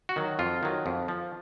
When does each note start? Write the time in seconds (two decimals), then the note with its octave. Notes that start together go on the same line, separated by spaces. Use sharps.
0.09 F#4
0.16 D#3 F#3
0.39 F2 F4
0.63 D#3 F#3
0.86 F2
1.08 F3